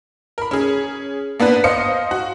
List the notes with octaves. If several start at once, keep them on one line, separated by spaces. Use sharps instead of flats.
A#4 B5
C#4 G#4
A#3 B3 D4 B4
C5 D#5 F5 C#7
F#4